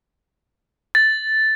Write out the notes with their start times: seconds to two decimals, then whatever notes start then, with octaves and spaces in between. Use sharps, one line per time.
0.95 A6